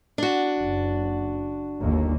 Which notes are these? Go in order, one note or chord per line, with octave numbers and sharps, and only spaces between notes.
D4 F#4
F#1
G1 D#2 A#3